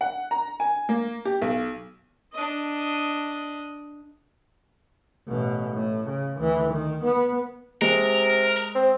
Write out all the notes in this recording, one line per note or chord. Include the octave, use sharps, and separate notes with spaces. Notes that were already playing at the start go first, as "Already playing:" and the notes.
F#5
A#5
G#5
A#3
G4
B1
D4 D#5
A1 B2
A2
C#3
D2 E3
D#3
B3
C3 G#3 A#4
C4